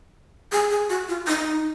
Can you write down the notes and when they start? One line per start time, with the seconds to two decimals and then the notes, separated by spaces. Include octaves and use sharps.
0.52 G#4
0.71 G#4
0.90 F#4
1.09 F4
1.28 D#4